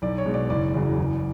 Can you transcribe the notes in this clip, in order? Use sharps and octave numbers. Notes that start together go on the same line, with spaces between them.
B1 D5
C#5
B2 G#3
D5
F#1 D5
E2 C#3 F#3
F#1